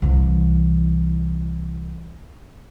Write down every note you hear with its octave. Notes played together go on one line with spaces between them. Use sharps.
C2 E3